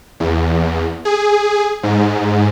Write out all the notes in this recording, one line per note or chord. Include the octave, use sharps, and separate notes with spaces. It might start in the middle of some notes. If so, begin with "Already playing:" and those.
E2
G#4
G#2